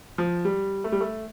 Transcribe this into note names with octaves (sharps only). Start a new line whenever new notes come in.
F3
G3
A3
G3
A3